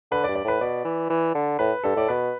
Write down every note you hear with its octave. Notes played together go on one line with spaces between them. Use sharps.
D3 B4
D5
G2
D5
A2 B4
B2 D5
E3
E3
D3
A2 B4
G2 A4
A2 D5
B2 B4